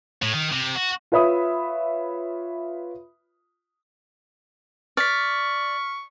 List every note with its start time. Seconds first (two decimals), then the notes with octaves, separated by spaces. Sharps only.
0.22 A2
0.34 D#3
0.53 C3
0.76 F#4
1.12 F4 B4 C#5 E5 B5 D#6
4.97 D5 C#6 F6 B6